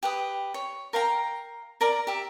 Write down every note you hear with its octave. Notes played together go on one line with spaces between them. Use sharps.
G4 B4 D#6
C#5
A#4 F5 G5 A#5
A#4 D5 A#5
G4 E5